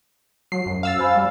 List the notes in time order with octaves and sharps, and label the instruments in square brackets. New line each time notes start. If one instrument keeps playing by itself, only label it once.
[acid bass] F#3 [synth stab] C7
[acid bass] F#2
[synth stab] F5 E6 A6
[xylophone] C5 G#5 B5
[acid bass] G3